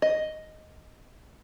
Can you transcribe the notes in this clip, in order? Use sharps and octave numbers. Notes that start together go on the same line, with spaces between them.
D#5